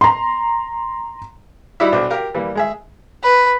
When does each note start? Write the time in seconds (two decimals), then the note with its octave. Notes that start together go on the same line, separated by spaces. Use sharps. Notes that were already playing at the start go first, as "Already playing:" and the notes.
0.01 A#5 C6
1.80 G3 D#4 E4 F#4 D5 E5
1.92 B1 D4 C5 D6
2.10 G4 A#4 F5
2.34 E3 G3 A#3
2.55 G#3 G#4 E5
3.23 B4